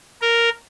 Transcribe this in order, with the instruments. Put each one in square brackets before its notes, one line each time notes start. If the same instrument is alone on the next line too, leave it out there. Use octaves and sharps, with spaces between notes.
[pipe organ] A#4